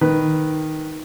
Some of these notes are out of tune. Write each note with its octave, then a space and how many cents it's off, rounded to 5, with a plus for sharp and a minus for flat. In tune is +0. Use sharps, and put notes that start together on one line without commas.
D#3 +0 B4 +0